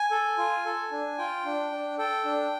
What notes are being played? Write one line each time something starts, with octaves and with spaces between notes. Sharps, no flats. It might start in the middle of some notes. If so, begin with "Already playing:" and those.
Already playing: G#5
A4
F4
A4
D4
F4 G5
D4
D4
A4 G5
D4